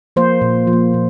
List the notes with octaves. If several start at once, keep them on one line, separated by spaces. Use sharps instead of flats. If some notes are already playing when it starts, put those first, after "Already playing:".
F3 A#3 C5
A#2
F3
A#3
A#2